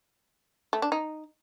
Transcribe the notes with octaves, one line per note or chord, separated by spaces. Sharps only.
A3
D4
D#4